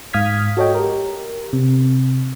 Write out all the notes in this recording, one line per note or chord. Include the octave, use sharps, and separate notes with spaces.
G#2 F5 D#6 F6 G#6 B6
F#4 A4 C#5 D#5 G5
G4 A#4
C3